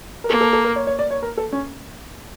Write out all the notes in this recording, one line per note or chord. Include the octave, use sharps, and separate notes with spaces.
A#4
A#3 A4
A4
A4
A#4
C#5
C#5
D5
C#5
A#4
A4
C#4